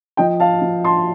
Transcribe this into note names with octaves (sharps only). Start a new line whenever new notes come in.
F3 D#5 G5
F5 A5
F3
A5 C6